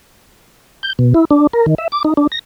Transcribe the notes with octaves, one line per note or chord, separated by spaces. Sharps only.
G6
B2
E4
D4
A#4
D#3
E5
D6
D#4
D4
A#6